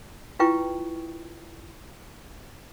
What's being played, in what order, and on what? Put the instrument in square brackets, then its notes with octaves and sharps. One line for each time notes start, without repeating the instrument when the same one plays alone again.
[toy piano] E4 F4 B4 G5 C#6